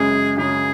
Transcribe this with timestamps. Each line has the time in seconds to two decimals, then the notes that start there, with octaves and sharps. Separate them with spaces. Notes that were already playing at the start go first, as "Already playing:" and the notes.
Already playing: F#2 C#3 G#3 C#4 G#4
0.37 F#2 C#3 G#3 C#4 G#4